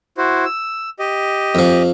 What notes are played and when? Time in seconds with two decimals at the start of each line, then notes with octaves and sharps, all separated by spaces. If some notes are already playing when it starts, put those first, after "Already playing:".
0.17 E4 F#4 C5
0.46 E6
0.99 G4 D#5
1.55 F2 F3